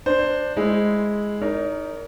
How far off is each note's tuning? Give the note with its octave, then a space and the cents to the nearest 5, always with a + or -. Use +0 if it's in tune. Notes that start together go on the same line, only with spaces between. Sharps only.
D4 +10 C5 +0
G#3 +0 E4 +0
D#4 +0 A#4 +0 C#5 +45